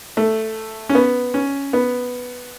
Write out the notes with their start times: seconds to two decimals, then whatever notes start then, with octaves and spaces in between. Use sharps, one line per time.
0.17 A3
0.89 C#4
0.95 B3
1.34 C#4
1.73 B3